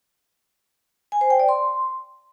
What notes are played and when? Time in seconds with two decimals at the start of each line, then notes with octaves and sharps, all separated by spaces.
1.12 G#5
1.21 C5
1.30 G5
1.39 D5
1.49 C6